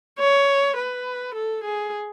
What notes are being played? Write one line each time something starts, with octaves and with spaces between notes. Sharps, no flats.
C#5
B4
A4
G#4